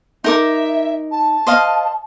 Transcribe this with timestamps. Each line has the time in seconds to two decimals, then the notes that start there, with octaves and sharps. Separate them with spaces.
0.24 D#4 A#4 E5 D6
1.11 A5
1.47 C5 D#5 F5